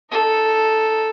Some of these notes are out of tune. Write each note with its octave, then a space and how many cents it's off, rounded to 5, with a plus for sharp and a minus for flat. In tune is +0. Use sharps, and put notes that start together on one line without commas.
D#4 +0 A4 +0